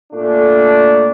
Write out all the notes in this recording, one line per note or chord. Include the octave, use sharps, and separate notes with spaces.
A#2 A3 D4